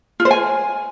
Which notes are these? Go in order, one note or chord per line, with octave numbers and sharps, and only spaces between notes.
F4
C5
G#5